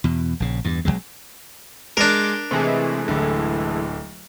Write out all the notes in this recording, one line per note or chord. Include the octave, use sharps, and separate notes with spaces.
E2 B2
A#1 C#3
E2 G2
B1 F2 F#3 G#3
G#3 D4 A#4 D6 G6
C3 E3 G#3 A3 G#4
D1 D3